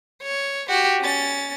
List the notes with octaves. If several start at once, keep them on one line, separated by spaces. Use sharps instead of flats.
C#5
F#4 G4
C#4 A6